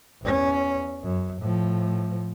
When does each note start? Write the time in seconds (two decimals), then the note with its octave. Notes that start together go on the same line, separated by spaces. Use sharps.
0.23 E2 C#4
1.04 F#2
1.41 A2 F3